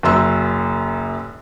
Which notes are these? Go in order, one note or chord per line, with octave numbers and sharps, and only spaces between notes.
F#1 F#2 C6 E6